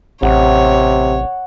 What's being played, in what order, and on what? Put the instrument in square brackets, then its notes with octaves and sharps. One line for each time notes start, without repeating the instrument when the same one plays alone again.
[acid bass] A1 [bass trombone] C3 [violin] C#5 [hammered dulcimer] F#5